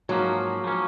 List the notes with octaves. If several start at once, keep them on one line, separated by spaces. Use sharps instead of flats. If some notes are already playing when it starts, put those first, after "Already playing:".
G#2 F3 F#3 A#3 C#4
F3 A#3 C#4